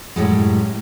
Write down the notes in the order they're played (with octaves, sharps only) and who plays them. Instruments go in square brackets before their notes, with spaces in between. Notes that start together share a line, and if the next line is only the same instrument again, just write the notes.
[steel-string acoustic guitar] F#2 A2 G3 G#3